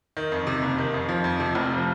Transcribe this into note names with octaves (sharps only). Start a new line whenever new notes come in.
D#3
F2
C3
F#1
D#3
F2
F3
F2
C3
F1
F3